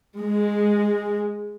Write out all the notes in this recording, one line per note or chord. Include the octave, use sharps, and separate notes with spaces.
G#3